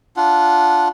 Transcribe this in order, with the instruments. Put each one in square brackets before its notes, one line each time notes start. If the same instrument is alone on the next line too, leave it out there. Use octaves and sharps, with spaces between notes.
[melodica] D4 F4 F#5